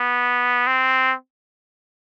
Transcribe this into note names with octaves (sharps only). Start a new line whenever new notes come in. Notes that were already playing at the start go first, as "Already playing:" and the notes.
Already playing: B3
C4